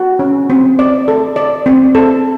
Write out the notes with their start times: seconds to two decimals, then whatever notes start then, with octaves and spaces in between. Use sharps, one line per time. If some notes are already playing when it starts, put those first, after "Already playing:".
Already playing: F#4
0.19 C#4
0.50 C4
0.79 D5
1.08 A4
1.36 D5
1.66 C4
1.95 A4